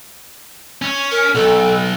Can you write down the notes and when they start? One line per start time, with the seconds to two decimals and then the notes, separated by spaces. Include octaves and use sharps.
0.82 C#4
1.11 A#4
1.35 B1 A4